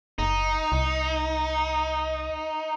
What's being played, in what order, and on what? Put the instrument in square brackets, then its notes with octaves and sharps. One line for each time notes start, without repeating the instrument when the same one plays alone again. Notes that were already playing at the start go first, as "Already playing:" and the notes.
[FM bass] F#1 [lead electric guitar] D#4
[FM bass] C2